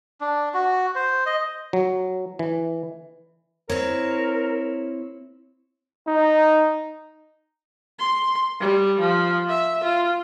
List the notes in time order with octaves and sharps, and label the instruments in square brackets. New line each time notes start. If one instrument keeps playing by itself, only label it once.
[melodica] D4
F#4
C5
D#5
[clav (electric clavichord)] F#3
E3
[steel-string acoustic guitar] C4 E4 C#5 [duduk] A#4
[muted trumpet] D#4
[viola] C6
G3
F3
E5
F4